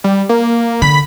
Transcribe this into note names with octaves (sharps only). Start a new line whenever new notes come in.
G3
A#3
D3 B5